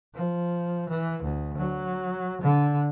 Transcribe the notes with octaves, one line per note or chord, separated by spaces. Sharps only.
F3
E3
D2
F#3
D3